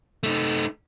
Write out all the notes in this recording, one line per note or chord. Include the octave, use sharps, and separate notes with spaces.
A3 D#4